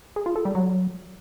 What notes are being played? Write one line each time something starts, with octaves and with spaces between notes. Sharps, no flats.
G#4
F4
A4
G3
F#3